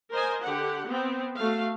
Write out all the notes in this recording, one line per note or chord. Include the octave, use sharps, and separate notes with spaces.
A#4 C5 D#5 G#5
D3 G4 F#5
B3 C4
A3 F#4 F5